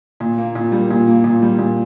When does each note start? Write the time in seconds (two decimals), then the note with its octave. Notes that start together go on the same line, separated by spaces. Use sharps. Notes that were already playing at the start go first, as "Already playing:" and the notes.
0.20 A#2
0.38 A#3
0.55 A#2
0.72 G3
0.90 A#2
1.07 A#3
1.24 A#2
1.42 G3
1.59 A#2